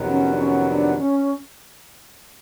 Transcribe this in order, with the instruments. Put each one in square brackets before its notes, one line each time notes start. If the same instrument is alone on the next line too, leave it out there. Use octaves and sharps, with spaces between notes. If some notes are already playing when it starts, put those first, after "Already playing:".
Already playing: [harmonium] F2 C3 D#3 F#3 B3
[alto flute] C#4
D4
C#4
D4
C#4